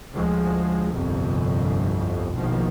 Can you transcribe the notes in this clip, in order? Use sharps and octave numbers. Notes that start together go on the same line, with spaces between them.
D2 F3 G#3
G1 C2 F2 C3
A#1 B2 D#3 F3